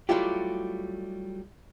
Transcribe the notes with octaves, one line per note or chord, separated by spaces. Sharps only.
F#3 G3 A3 E4 F4 G4